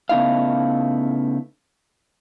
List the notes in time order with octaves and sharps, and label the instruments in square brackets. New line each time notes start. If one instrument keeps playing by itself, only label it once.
[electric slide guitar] C#3 A3 B3 D#4 E4 F5